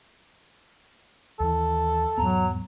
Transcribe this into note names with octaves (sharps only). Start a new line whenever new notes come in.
D#2 E3 A4
E2 G#2 F#3 B3 A#5